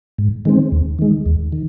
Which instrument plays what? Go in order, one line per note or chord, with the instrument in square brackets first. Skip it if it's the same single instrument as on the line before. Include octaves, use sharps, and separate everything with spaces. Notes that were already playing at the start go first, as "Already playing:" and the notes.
[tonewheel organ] G#2
D#3 G#3 C4
D#2
D#3 G#3
D#2
D#3